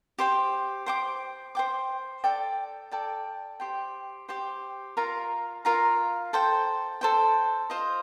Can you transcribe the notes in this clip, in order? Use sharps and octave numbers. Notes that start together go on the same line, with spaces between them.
G4 C5 G5
C5 G5 D6
C5 G5 D6
A4 D5 G5
A4 D5 G5
G4 C5 G5
G4 C5 G5
F4 A#4 F5 A#5
F4 A#4 F5 A#5
A4 C5 G5
A4 C5 G5
F4 C5 D#5